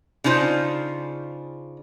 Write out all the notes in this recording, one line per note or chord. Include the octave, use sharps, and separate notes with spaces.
C#3 D4 D#4 F4 C5